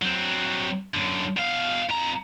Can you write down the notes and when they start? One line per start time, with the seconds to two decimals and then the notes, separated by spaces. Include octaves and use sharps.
0.02 F#3 C4
0.94 F#2 D3
1.37 B2 F5
1.89 F2 A#5